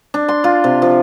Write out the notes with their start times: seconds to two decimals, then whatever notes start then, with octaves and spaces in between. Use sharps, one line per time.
0.14 D4
0.29 C6
0.44 F4
0.64 C3
0.82 F3